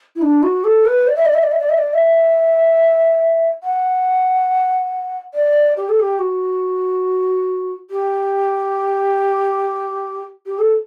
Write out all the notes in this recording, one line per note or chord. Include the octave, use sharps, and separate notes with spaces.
E4
D4
F#4
A4
B4
D5
E5
D5
E5
D5
E5
D5
E5
D5
E5
F#5
D5
G4
A4
G4
F#4
G4
G4
A4